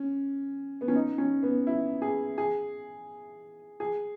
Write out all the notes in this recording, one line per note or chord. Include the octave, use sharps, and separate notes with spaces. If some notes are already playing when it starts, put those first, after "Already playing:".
Already playing: C#4
B3
C#4
D#4
C#4
B3
E4
G#4
G#4
G#4